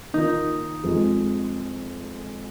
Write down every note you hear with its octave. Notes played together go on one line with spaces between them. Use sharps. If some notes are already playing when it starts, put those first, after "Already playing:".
D#3 A#3 D#4 F4
F2 F3 G#3